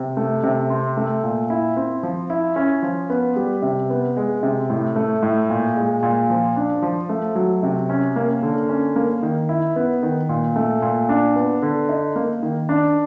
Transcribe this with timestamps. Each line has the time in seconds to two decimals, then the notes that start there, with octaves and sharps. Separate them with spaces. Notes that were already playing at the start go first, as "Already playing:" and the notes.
Already playing: C3
0.17 A3
0.43 C3
0.70 C4
0.97 A3
1.23 A#2
1.50 E4
1.77 C4
2.03 F3
2.30 E4
2.56 C#4
2.83 F3
3.10 B3
3.36 G3
3.62 C3
3.90 B3
4.17 G#3
4.43 C3
4.70 A2
4.96 A3
5.23 A2
5.49 A#2
5.76 G#3
6.03 A#2
6.30 F3
6.56 D4
6.82 F3
7.09 A3
7.35 F#3
7.63 C3
7.89 C#4
8.16 A#3
8.43 D3
8.69 C#4
8.96 A#3
9.23 D#3
9.49 E4
9.76 B3
10.03 D#3
10.29 A#2
10.56 A3
10.82 A#2
11.09 D4
11.36 B3
11.62 D3
11.89 D#4
12.16 A#3
12.43 D#3
12.69 D4